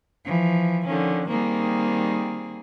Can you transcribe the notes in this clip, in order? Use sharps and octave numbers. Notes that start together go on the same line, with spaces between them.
E3 F3
D3 D#3 F3 C#4
D#3 G3 A#3 C4 G#4